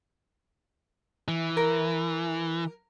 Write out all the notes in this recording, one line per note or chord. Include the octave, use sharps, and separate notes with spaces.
E3
A#4